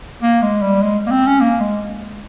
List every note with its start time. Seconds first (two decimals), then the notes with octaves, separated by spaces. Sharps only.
0.22 A#3
0.42 G#3
0.62 G3
0.82 G#3
1.07 A#3
1.11 C4
1.26 C#4
1.41 A#3
1.60 G#3